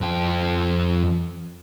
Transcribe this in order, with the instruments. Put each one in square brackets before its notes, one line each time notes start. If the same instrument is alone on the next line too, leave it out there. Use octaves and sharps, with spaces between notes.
[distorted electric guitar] F2 G5